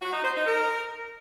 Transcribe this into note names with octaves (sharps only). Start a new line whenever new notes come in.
F#4
D#4
C5
D#4
A#4